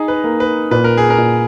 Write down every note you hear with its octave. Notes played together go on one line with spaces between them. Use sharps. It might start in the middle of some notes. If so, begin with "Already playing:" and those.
Already playing: D#4 G#4
B4
A#3
B4
A#2 B4
A#4
G#4
A#4
A#2